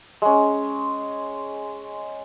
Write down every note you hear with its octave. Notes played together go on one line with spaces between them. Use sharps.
G#3 C#4